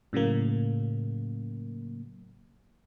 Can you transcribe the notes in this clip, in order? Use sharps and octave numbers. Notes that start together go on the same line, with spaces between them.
A2 C#3 F#3 A#3